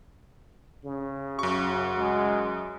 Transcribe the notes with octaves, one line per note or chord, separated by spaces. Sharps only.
C#3
F#2 F#4 C#6
G#3